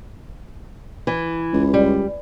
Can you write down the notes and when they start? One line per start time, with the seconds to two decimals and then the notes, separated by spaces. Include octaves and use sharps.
1.07 E3
1.53 C#2
1.74 G3